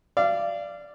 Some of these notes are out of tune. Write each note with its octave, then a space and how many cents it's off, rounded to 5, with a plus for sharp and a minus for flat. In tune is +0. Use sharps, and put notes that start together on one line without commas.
D5 +0 F5 -30